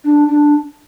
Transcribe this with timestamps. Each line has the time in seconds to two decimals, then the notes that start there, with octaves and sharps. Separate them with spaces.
0.04 D4
0.28 D4